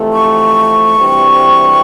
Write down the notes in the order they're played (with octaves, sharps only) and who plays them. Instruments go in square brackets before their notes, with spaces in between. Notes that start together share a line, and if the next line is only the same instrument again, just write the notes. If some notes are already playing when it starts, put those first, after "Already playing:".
Already playing: [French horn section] F2 C3 E3 A3
[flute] C#6
[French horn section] D2 C3 E3 G3 C4